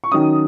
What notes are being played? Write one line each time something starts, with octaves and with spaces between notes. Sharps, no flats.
C#6
D#3 F#3 C#4 D#6